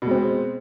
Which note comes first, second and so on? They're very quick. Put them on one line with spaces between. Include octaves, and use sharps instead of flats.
B2 G#3 C4